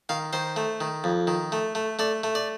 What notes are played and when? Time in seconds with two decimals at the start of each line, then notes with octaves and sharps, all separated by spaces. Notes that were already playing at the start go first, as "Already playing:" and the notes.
0.09 D#3 F5
0.33 D#3 C5
0.56 A3
0.81 D#3
1.04 F2
1.27 D#3
1.52 A3
1.75 A3
1.99 A3 D5
2.24 A3
2.35 D5